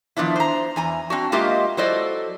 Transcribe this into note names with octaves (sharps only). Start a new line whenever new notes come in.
D#3 F3 B3 D4 E4
C5 A#5
E2 G#5 A#5
C4 D4 F#4
G#3 A#3 F4 G4 D#5 E5
F#3 E4 A4 C5 D5 D#5